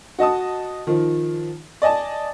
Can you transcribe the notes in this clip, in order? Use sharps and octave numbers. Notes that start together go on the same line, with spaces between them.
F#4 D#5 A5 D#6
D#3 F3
D5 D#5 G#5 A5